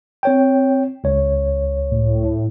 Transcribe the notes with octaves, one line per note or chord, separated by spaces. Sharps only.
C4 C#5 G5
C#2 C#5
A2